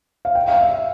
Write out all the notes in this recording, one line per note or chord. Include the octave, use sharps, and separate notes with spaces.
F5
G5
F5
E5